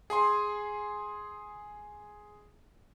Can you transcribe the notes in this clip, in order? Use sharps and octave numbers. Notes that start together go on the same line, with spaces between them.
G#4 G#5 C6